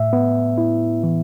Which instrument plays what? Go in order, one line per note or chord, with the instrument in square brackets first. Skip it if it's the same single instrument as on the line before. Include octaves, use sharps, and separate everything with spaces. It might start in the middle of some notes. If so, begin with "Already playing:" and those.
Already playing: [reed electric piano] A2 E5
B3
E4
E3